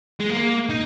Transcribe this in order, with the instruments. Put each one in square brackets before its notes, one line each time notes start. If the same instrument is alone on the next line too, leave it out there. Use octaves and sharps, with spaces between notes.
[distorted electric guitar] G#3
A#3
D#4